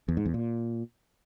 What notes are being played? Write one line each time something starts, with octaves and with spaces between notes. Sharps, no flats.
E2
G#2
E2
A#2